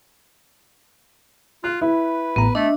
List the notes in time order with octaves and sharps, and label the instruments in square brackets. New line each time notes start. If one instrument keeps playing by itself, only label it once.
[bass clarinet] F4 [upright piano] F#6
[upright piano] E4 [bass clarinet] B4
[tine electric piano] A1 A2 A#5 [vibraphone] B3
[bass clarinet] A3 [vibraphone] D4 [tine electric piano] D#5 E5